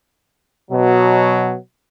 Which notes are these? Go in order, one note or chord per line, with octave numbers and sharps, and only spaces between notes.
B2 F#3